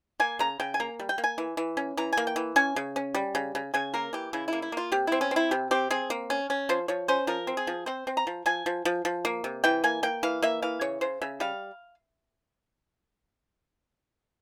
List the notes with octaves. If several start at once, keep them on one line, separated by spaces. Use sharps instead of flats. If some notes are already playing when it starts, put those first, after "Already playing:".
A#3 G#5
C#3 A#5
C#3 G5
G#5
A#3 A#5
G3
G5
A#3
G#5
E3
E3
C#4
E3 A#5
A#3 G#5
G5
E3
C#4 G#5
C#3
C#4
G3
C#3
C#3
C#3 G#5
A#3 A#4
E3 G4
C#3 E4
A#3 E4
E4
A#3 F4
C3 G4
C4 E4
C#4
C4 E4
C3 G4
C4 G4
C4 G#4
A#3
C#4
C#4
F3 C5
F3 C#5
C#4 C5
F3 A#4
C4
G#4
F3
C4 C5
C4
A#5
F3
F3 G#5
F3
F3
F3
A#3
C3
E3 G5
A#3 G#5
A#3 G5
E3 F5
A#3 E5
E3 F5
C#3 C#5
C#3 C5
C#3 E5
G3 F5